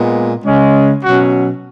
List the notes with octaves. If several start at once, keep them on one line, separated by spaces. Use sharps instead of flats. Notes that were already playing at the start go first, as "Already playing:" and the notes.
Already playing: A#2 G#3 B3
C#3 G#3 C#4
B2 F#3 C#4 F#4